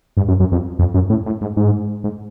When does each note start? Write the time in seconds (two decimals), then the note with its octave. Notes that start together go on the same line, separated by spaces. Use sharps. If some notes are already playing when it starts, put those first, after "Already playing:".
0.17 G2
0.28 F#2
0.40 F#2
0.52 F2
0.79 F2
0.94 F#2
1.10 A2
1.26 A2
1.41 G#2
1.57 G#2
2.04 G#2